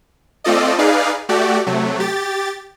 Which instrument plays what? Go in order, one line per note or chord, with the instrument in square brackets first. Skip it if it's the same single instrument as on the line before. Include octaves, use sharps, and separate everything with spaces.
[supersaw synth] A3 C4 F4 A4 D5 D#5
D#4 G#4 B4 D5 F5
A3 F#4 G4 D5
C3 F#3 A3
G4 A6